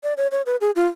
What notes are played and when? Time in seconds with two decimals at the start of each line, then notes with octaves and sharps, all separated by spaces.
0.03 D5
0.17 C#5
0.32 C#5
0.46 B4
0.61 G#4
0.76 F4